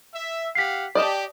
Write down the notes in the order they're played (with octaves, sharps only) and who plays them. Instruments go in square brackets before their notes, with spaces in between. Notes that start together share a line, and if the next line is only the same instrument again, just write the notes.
[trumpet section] E5
[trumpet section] G4 F5 F#5 [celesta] B6 C7
[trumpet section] G4 [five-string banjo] D5 D#5 A5